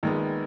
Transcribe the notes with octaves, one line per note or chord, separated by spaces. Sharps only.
A#1 A#2 D#3 G#3 B3